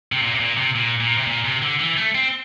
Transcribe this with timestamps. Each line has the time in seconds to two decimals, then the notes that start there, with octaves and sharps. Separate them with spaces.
0.12 C3
0.22 A#2
0.35 C3
0.40 A#2
0.57 C3
0.75 A#2
1.00 A#2
1.18 C3
1.27 A#2
1.45 C3
1.62 D3
1.80 E3
1.97 A3
2.15 C4